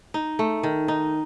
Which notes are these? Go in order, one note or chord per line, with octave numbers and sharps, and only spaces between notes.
D#4
A3
D#3
D#4